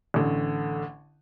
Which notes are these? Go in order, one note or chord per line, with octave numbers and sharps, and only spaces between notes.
A1 D3